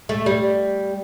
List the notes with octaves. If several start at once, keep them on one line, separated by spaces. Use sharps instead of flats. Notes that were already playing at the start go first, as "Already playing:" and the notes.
A3
G3